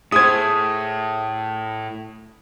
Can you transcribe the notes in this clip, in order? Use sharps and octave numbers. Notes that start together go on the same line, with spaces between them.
A2 G#4 C5 D#6 G#6